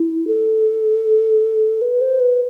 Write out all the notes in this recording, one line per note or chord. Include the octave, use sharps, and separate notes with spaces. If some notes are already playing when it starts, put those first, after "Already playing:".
Already playing: E4
A4
B4
C5
B4